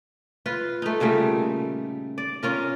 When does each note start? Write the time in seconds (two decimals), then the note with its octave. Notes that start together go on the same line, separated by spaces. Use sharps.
0.46 F4 B4
0.82 A3 D#4
1.00 A#2 C#3 G3 A3
2.18 D5
2.43 C#4 F4 A#4